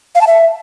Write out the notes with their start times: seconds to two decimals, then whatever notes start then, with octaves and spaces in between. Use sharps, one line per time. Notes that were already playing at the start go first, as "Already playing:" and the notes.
0.15 F5
0.21 A5
0.27 E5